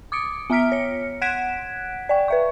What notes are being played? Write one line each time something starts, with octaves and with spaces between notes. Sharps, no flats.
D6 D#6 C#7 D7
B3 E5 A#5 F6 B6 D7
C#5 C#7
F#5 F#6 G#6 B6 D7 E7
D5 G5
B4 E5 C#6